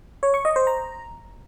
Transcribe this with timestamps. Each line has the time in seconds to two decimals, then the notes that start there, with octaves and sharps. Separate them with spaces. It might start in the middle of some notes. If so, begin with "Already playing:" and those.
0.23 C#5
0.34 C#6
0.45 D#5
0.56 C5
0.67 A#5